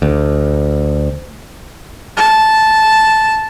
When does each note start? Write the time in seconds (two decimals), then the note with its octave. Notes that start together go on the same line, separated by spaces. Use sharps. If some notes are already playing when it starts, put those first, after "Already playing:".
0.02 D2
2.17 A5